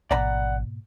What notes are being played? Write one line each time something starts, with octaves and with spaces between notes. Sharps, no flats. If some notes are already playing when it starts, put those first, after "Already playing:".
A1 G#2 B2 A#3 D5 F#5 A#5 B5